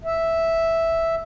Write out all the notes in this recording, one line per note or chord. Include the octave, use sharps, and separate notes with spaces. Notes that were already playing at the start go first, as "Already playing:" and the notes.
E5